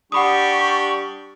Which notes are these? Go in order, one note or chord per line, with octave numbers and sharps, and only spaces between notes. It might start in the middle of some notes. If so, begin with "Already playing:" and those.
G3 D4 G4 F#5 B5 C#6 D#6